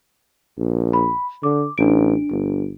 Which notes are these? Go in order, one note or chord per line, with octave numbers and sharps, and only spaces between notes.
A#1
B5
D3 D6
A1 D4 D7
G1